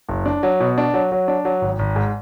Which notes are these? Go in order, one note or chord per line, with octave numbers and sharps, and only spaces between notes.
F#1
D4
F#3
B2
D4
F#3
F#3
D4
F#3
G#1
G#1
G#2